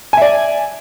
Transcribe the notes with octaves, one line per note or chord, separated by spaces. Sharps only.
D5 E5 G#5